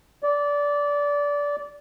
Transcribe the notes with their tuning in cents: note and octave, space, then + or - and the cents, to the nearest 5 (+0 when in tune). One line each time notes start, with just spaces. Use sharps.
D5 -20